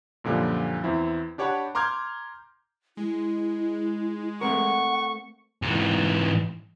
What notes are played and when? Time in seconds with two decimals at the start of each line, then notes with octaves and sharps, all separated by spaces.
0.24 F#2 A#2 D3 F3 G3
0.84 E2 C4 E4
1.38 D4 G4 C#5 F#5 A5 B5
1.75 A#5 C6 D6 F6 G6 G#6
2.97 G#3 E4
4.41 A3 C4 A#4 F#5 C#6
5.62 G#2 E3